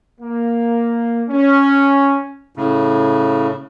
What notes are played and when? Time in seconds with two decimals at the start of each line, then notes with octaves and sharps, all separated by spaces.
0.20 A#3
1.29 C#4
2.56 A2 C#3